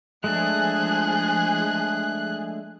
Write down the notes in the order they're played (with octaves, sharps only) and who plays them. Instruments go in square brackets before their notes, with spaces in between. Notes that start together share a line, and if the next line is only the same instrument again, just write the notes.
[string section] F3 G#4 [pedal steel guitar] G#3 A3 D4 [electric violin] F#6